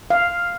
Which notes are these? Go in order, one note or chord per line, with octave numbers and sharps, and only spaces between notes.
F5